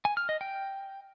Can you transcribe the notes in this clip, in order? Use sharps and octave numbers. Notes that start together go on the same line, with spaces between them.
G#5
F6
D#5
G5